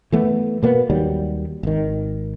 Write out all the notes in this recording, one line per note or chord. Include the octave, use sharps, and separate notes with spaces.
E3 A3 B3
B2 A#3 B3
D#2 D#3 F#3 G3
G#1 D#3